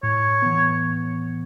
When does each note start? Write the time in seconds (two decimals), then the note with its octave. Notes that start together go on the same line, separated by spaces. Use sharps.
0.03 A2 C#5
0.42 E3 B3